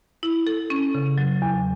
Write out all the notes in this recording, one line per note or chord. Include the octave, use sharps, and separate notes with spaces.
E4
A4
C#4
C#3
F#3
E2